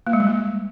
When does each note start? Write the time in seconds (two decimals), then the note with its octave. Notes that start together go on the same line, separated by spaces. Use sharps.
0.07 A#3
0.13 G#3
0.20 G3
0.27 A#3